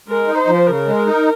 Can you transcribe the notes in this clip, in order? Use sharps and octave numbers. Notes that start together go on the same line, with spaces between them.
G#3 A#4
D#4
C5
F3
C#3 A#4
G#3
D#4